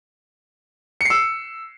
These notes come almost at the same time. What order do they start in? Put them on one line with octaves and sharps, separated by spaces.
C#7 C7 E6